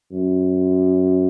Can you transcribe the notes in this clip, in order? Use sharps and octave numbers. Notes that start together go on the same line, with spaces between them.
F#2